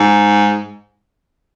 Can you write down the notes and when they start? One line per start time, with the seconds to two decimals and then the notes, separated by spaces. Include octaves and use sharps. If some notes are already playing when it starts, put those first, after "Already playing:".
Already playing: G#2